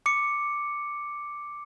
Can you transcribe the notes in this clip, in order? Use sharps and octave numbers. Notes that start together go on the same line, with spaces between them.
D6 C#7